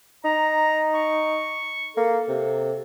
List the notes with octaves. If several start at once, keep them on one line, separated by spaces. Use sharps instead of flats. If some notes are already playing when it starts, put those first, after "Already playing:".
D#4 A#5
C#6
A#3 A4
C3